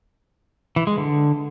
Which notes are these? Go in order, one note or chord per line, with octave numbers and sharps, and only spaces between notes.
E3
G#3
D3